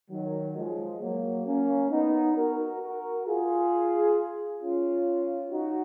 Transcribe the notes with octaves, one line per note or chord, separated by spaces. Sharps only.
D#3 F#3
F3 G#3
F#3 A#3
A#3 C#4
B3 D#4
F#4 A#4
F#4 A#4
F4 G#4
C#4 F4
D#4 F#4